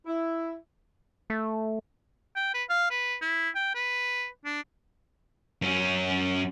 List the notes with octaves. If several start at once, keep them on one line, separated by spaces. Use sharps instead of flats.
E4
A3
G5
B4
F5
B4
E4
G5
B4
D4
F#2 C#4